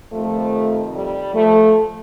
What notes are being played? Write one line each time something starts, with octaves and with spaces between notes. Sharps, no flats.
F2 C3 D#3 F3 A3
G3
F3 A3